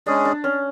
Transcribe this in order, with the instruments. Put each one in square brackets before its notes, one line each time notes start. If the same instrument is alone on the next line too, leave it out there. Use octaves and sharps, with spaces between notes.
[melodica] G#3 C#4 G#4 [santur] D4
[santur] D4
C#4